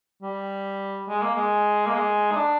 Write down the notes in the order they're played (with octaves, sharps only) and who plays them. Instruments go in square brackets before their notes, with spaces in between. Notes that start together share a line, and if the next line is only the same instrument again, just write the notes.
[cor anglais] G3
G#3
A#3
G#3
A#3
G#3
D#4
D4